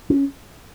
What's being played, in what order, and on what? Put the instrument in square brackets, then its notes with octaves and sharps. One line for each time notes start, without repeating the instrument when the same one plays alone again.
[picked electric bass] C#4